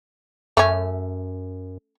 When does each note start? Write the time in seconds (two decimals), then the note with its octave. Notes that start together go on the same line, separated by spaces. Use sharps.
0.57 F#2 A3 C#4